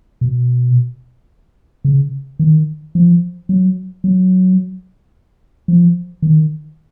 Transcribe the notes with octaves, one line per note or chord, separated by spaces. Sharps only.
B2
C#3
D#3
F3
F#3
F#3
F3
D#3